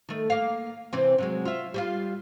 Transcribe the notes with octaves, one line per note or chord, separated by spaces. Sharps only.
D#3 A3
A#3 F5
C3 E3 C4
C3 F#3 G#3
F4 E5
G3 D4 F4